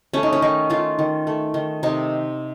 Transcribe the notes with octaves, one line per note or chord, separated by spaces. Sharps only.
A3 C#4
D#4
C#4
D#3 D#4
A3 F4
D#3
A3
D#3
C3 D#4